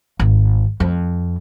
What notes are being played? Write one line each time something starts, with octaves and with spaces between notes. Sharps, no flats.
G#1
F2